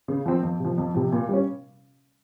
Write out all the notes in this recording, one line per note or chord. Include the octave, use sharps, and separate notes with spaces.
C#3
F3 C4
F2
C3 F3
F2
C3 F3
A#2
G3 C#4